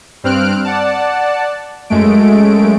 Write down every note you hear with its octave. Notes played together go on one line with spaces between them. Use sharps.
G2 C4 F6 F#6 D7
D5 F#5 A5
F#2 G#3 A3 D7